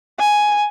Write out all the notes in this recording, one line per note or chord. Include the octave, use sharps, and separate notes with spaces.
G#5